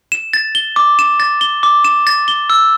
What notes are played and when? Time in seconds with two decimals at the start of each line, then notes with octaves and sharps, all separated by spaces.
0.12 E7
0.33 A6
0.55 G7
0.76 D6
0.99 E7
1.20 A6
1.41 G7
1.63 D6
1.85 E7
2.07 A6
2.28 G7
2.50 E6